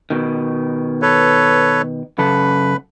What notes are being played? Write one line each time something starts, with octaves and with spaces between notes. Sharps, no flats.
B2 D#3
A4 B4 C#5
F#2 C#3 A4 B4 B5